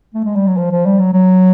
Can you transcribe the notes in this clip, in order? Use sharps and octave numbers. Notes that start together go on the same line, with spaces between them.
A3
G#3
G3
F#3
F3
F3
G3
F#3
F#3